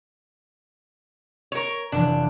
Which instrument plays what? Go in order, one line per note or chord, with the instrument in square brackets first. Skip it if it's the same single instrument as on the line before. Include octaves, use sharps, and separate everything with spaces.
[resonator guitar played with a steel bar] A#4 C#5
[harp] F1 E3 [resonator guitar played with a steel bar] D4